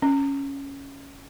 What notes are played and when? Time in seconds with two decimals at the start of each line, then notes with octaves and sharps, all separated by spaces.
0.02 C#4